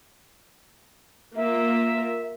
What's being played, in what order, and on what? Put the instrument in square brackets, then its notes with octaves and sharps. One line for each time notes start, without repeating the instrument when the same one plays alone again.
[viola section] A#3 F4 A#4 [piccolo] E5